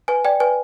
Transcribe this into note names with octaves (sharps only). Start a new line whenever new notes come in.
B4 G#5
D5 G5
B4 G#5